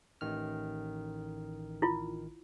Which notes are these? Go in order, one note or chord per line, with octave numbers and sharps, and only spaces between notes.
A1 D#3 F6
E4 F4